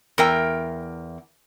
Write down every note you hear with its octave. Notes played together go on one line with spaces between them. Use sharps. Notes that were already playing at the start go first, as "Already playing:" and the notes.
E2 A#4 G5